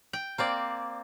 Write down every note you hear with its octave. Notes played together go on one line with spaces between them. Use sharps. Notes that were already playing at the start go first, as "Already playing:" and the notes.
G5
A#3 C4 D5